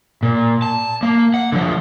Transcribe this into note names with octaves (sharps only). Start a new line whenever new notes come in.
A#2
A5
A#3
F#5
D3 F3